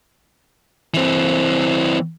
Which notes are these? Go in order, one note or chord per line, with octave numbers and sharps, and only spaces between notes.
E3 C4